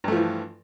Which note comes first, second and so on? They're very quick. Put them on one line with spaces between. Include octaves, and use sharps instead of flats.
G2 A3 F3 E3